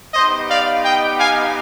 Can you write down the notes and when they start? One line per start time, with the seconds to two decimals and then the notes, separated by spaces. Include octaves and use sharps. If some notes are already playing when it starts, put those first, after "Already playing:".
0.14 B3 D#4 G4 C5 D#5
0.49 D5 F5
0.84 D#5 G5
1.19 F5 G#5